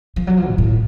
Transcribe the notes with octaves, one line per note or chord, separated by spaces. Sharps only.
F3
F#3
F3
A2
A2